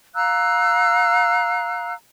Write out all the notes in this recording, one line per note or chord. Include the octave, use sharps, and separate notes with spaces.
F5 A#5 E6 F#6